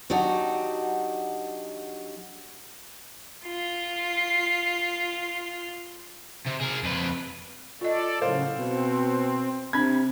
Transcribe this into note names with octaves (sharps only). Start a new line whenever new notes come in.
F#3 D4 D#4 F#4 G4 D#5
F4 C7
C3
G#4 A#4
F2 B4
F4 A4 D5 D#5
A2 C#3 F#3 C5 F5
B2 C4
C3 C4 D4 B5 G#6